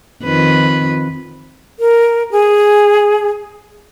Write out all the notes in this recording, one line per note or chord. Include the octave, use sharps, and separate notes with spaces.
F2 D#3 B4
A#4
G#4